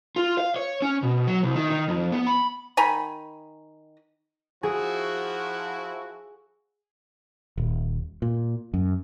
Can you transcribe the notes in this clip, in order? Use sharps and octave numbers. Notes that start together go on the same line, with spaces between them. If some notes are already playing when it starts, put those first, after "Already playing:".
F4
F5
C#5
C#4
B2
F#3
C2
D#3
D#3
F2
B3
B5
D#3 G#5 A#5 B5
F3 E4 F#4 G#4
D#1
A#2
F#2